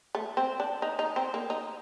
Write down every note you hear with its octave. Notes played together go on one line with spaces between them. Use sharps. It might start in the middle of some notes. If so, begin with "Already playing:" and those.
A3
C4
D4
D#4
D#4
C4
A#3
D#4